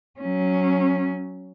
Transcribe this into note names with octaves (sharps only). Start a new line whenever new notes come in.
F#3 C#4